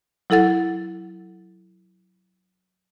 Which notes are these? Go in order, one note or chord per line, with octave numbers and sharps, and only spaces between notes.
F#3 E4 A4 F#5 A6